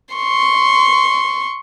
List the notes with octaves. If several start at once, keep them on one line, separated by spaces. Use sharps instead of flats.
C6 C#6